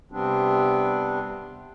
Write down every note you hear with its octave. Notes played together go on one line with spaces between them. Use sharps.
C3 G3 B3 C4 D4